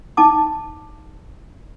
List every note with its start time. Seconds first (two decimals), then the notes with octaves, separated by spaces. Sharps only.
0.17 D#4 A5 D6